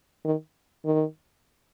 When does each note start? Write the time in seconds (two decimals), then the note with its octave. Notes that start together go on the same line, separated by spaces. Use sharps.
0.25 D#3
0.85 D#3